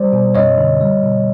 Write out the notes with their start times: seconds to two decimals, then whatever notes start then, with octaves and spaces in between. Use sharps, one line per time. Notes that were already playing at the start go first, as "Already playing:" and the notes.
Already playing: G3 C5 D5
0.13 B2
0.35 F#2 C#5 D#5
0.58 D3
0.81 G3
1.04 B2